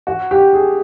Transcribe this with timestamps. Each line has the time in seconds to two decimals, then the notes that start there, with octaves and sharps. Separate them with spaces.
0.07 F#4
0.31 G4
0.53 G#4